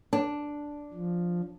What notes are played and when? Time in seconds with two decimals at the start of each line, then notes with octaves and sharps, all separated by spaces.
0.13 D4
0.94 F3